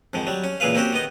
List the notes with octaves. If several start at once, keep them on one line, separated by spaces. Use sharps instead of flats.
F2 G#2 D#3
F#3 G3
C#4
C#2 A#2 E3 G#4 B4 F5
A#3 C4 C#4 F#4 G4
D#3 B3 D#5